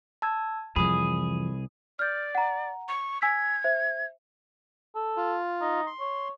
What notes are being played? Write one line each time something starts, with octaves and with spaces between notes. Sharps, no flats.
A5 E6 G#6
C2 F2 E3 G#4 B5 D#6
D5 F6 G6
F#5 A#5
C#6
G#5 E6 G#6 B6
C5 E5
A4
F4
D#4
C6
C#5